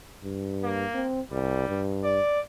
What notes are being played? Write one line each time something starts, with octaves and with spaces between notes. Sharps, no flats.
G2
A#3
C4
C2 G3
G2
D5